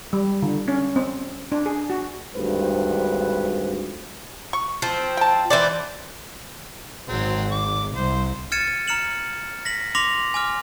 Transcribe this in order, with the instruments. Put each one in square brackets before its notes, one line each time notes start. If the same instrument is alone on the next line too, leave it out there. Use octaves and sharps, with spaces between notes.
[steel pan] G3
D3
C#4
C4
D4
G#4
F#4
[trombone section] G#1 D2 G2 F4 B4 C5
[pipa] C#6
[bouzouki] F3 C4
[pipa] G5 A5
[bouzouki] E3 C5 D5
[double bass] G#1 [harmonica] F#3 C4
[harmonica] D6
[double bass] C2 [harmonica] C5
[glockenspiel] F6 G#6 A6 C#7 D#7 E7
A#5 F6 C#7 E7 F#7
A#6 B6 F#7
C6 D6 A#6 F7 F#7
G#5 D6 F6